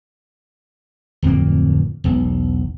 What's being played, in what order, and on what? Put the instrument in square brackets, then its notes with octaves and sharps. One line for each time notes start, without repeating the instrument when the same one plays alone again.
[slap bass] D1 F2 G#3 A#3
E1 B1